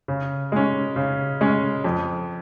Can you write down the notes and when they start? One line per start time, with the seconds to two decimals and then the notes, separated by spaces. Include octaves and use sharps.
0.08 C#3
0.52 G#3 C#4
0.96 C#3
1.41 G#3 C#4
1.84 F2